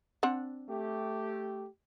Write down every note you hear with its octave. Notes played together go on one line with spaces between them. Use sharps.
C4 D4 F#5
A3 G4